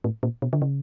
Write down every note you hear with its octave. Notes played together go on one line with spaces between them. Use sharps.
A2
A#2
B2
D3
C#3